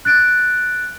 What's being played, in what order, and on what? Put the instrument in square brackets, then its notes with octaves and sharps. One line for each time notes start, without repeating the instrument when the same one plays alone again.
[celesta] F#6 A6 D7